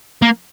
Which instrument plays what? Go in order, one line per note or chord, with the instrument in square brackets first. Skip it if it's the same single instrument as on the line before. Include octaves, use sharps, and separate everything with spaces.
[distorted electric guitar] A#3